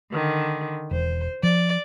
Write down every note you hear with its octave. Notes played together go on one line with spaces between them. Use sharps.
D3 D#3
E1 C5
F3 D5